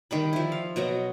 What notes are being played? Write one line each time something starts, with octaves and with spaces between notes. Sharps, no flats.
D#3 G3 B5
F3 E4
F5
B2 F#3 D#5